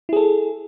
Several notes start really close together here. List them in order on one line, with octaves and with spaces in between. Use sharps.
E4 G#4 A4